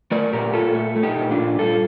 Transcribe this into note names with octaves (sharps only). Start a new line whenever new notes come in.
A3 A#4 D5
A#2 G4 A#4
A#2 F4 A4
A3
A3
D#4 G4
A#2
D4 F4
A#2
G2 F4 A4